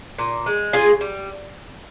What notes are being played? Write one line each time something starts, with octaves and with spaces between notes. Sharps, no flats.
A#2
G#3
C#3 F4 G#4
G3